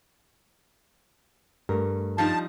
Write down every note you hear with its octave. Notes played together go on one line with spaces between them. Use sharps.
G2 A3 A#4
F3 G3 D#4 A5